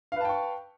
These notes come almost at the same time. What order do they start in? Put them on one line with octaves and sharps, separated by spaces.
F5 B4 A5 G5 C#6